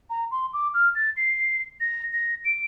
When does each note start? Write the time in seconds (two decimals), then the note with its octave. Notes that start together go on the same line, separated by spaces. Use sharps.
0.10 A#5
0.31 C6
0.53 D6
0.74 F6
0.95 A6
1.17 C7
1.80 A#6
2.12 A#6
2.45 D7